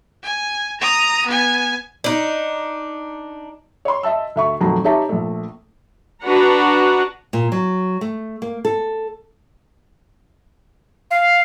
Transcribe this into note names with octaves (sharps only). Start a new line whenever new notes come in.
G#5
A#5 D#6
B3 G#5
D4 D#4
C#5 C6
D#5 E5 A5 E6
D2 E5 C#6
D#1 F2 D#3 F#3 A3 A#5
D#4 G4 C#5 E5 A5 A#5
A#1 A3
D4 F#4 B4 F#5 A#5
A#2
F#3
A3
A#3
A4
F5